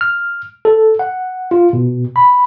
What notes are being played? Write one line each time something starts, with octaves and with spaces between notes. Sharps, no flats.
F6
A4
F#5
F4
B2
B5